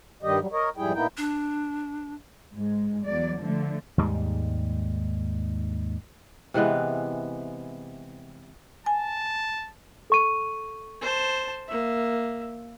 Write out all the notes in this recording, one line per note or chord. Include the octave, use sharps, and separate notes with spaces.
G2 D#3 G3 G4 D#5
F#3 G3
A#4 C#5 D#5
F2 G#2 G3 E4 G#4 G5
A#2 A#3 B3 D#4 E4 G5
D4
G#2 G#3
E2 F#3 D5
D3 F3 A3
D#2 G#2 G3 G#3
C3 E3 G#3 B3
G#5 A5
A4 C#6 D#7
C5 A5
A#3 E5